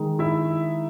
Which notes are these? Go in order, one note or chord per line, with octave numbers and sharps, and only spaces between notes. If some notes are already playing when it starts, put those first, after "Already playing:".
Already playing: D#3 G#3 D#4
E4 E5